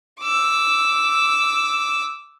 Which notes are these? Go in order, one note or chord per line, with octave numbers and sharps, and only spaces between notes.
D6 E6